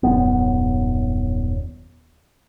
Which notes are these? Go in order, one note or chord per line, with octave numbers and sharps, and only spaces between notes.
D#1 F#2 B3